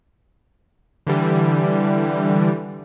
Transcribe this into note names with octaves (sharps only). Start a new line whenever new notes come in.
D3 E3 G3